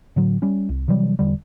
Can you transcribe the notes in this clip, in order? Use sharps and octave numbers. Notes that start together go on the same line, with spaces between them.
A2 D3 F#3
G3 C#4
C2
C3 E3 F#3 G3
E1 D3 G3